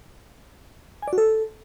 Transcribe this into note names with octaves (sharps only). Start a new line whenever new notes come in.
G#5
D5
F#4
A4